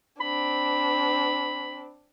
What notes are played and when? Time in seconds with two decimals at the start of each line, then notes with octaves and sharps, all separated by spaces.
0.21 C4 D4 B5